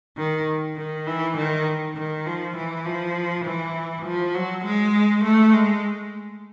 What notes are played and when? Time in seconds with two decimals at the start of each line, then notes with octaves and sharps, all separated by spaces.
0.17 D#3
0.77 D#3
1.07 E3
1.37 D#3
1.96 D#3
2.26 F3
2.57 E3
2.86 F3
3.45 E3
4.05 F3
4.34 F#3
4.65 G#3
5.24 A3
5.53 G#3